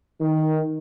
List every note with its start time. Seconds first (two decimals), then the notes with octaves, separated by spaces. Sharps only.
0.21 D#3